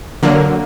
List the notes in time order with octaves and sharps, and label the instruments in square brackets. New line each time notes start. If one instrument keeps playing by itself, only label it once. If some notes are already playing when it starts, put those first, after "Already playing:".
[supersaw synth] D3 F#3 A#3